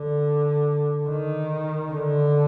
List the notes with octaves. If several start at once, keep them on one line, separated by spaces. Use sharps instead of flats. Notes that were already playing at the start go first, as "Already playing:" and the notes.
Already playing: D3
D#3
D3